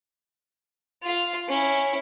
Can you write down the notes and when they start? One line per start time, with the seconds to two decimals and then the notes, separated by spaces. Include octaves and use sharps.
1.03 F4 F5
1.48 C#4 E4